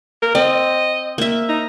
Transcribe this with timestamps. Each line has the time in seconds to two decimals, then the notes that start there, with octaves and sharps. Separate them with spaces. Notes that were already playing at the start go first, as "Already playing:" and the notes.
0.22 A#4
0.35 C4 D#5
1.18 A#3 E5
1.49 D#4